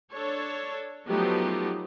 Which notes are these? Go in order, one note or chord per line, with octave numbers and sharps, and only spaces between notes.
D4 A4 C#5
F3 F#3 A3 B3 D#4 G4